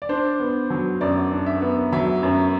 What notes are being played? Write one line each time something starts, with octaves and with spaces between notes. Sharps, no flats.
D5
D4 C5
B3
F#3
F#2 D5
D4
E5
B3
F#3 E5
F#2